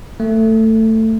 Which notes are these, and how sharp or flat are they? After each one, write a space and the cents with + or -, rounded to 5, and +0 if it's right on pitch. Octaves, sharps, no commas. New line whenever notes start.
A3 +15